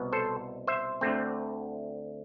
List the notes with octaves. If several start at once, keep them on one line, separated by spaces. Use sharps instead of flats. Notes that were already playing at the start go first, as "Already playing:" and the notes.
Already playing: C2 B2 B3
A4 C5
C5 E5
D2 D3 A3 C4